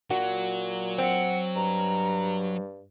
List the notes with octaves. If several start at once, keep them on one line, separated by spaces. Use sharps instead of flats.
A#2 F#3 F#4
C4 F#5
G2 A#5